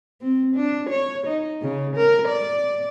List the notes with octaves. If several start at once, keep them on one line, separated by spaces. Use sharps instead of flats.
C4
D4
C#5
D#4
C#3
A#4
D5